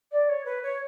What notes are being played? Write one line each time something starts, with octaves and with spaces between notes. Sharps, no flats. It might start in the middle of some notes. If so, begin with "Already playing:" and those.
D5
C#5
B4
C#5